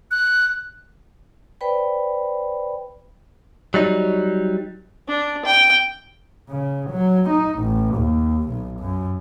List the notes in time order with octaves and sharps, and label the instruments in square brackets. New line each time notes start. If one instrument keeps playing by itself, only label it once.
[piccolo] F#6
[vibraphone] B4 C5 D5 G5 B5
[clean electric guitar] F#3 G3 D#4
[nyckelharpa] D4
G5
[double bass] C#3
F#3
D#4
A1
D#2
B1
F#2